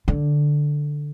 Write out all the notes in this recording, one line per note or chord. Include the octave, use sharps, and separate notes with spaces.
D3